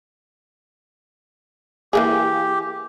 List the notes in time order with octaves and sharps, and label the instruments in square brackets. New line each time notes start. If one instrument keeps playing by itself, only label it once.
[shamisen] E3 A#3 G#4 [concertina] G4